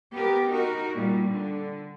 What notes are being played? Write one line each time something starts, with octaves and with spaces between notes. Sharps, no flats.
B3 G4 A#4
D#4 F#4 A#4
A#2 G3
D3